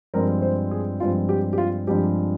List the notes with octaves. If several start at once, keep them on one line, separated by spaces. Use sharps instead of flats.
G2 F3 G#3 C4 A#4
C5
G#4
G2 F3 G#3 C4 F4
G4
G4
F4
G2 F3 G#3 C4 G4